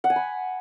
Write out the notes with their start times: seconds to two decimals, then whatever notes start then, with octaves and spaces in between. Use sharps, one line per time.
0.04 F#5
0.10 G#5
0.16 B5